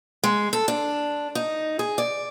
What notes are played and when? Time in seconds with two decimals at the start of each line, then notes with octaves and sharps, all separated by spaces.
0.24 G#3
0.53 A4
0.68 D4
1.35 D#4
1.79 G#4
1.98 D5